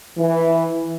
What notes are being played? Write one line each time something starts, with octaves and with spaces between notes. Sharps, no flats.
E3